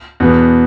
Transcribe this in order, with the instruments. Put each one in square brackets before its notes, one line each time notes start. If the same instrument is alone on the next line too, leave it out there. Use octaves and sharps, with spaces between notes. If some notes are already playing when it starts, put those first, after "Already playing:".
[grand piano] E2 B2 B3